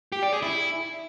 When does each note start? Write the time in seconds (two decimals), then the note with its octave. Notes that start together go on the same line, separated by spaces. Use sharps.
0.12 G4
0.22 D5
0.32 G#4
0.43 E4